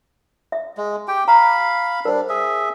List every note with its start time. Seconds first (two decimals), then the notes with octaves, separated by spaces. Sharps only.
0.52 E5
0.77 G#3
1.08 G4 G5
1.28 F5 A#5 B5
2.05 G3 D4 A#4 C5
2.29 G#4 E5